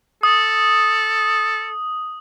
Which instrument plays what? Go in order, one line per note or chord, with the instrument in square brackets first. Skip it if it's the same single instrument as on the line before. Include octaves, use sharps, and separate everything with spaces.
[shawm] A4 [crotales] D#6